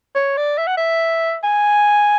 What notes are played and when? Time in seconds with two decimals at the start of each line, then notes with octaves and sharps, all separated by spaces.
0.15 C#5
0.37 D5
0.58 E5
0.67 F#5
0.77 E5
1.44 G#5